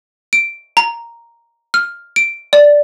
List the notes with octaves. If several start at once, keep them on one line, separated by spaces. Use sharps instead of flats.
D7
A#5
F6
D7
D5